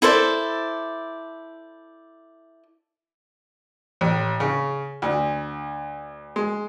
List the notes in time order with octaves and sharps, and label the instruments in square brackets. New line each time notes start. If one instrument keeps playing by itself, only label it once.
[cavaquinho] E4 A4 C5 D5
[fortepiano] A1
C#3
D2
G#3